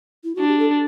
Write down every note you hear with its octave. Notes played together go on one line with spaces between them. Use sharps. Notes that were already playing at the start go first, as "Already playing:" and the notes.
E4
D4 F#4
G4
A4